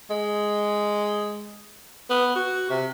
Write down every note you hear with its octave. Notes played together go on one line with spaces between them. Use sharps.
G#3
B3
F#4
C3